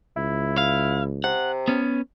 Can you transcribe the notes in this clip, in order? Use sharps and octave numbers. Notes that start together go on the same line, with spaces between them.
C#2 E4
F5
C3 F#5
B3 C#4